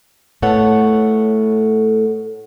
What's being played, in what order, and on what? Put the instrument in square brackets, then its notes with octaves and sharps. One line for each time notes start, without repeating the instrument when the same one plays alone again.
[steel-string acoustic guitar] A2 A3 B3 A4 C#5 F#5